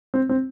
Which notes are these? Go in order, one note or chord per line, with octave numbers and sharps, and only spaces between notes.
C4
C4